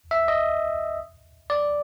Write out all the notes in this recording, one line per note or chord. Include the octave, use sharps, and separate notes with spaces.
E5
D#5
D5